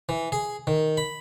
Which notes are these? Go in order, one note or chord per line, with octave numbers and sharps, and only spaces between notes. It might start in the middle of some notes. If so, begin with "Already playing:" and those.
E3
G#4
D#3
B5